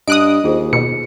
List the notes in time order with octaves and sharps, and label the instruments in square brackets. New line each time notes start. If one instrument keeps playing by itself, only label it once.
[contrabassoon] G2 [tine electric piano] D#5 [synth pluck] D#6 F#6 D7
[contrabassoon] D#2 [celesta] F4 G#4 C5
[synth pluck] B2 [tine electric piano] C#7